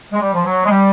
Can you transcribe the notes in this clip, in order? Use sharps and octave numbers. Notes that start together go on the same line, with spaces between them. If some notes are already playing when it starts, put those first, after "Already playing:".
G#3
G3
F3
F#3
G#3
G3